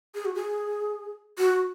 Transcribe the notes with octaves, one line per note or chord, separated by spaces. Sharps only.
G#4
F#4
G#4
F#4